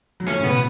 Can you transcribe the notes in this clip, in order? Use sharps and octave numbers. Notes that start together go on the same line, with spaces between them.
F#3
E3 A3 C#4
A2 C#3 B3
B2